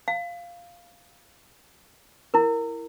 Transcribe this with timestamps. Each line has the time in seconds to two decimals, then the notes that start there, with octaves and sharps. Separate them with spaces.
0.08 F5
2.34 E4 A#4